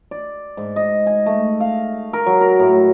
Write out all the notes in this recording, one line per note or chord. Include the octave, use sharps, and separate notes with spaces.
D5
G#2
D#5
G#5
A3
F5
A#4
F#3
A#4
A2